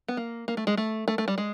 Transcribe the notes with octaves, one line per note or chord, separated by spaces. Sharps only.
B3
A#3
A#3
A3
G#3
A3
A3
A3
G3
G#3